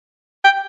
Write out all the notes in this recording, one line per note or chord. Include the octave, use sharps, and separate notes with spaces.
G5